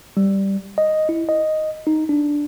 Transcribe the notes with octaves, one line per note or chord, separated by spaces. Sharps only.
G3
D#5
E4
D#5
D#4
D4